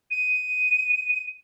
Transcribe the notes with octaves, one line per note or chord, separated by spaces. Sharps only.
D#7